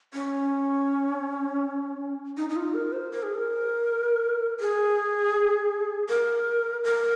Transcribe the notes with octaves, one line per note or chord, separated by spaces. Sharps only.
C#4
D#4
D#4
F4
A#4
C5
A#4
G#4
A#4
G#4
A#4
A#4